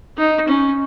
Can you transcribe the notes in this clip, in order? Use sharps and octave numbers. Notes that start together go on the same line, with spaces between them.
D#4
C#4